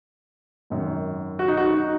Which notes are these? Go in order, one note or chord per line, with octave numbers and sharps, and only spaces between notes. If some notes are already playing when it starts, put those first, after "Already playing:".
G#1 F#2 D#3
F#4
D#4
F#4
D#4